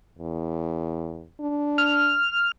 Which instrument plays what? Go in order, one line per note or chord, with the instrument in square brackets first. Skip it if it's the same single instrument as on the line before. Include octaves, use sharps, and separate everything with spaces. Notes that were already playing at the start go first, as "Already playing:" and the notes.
[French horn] E2
D4
[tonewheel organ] F6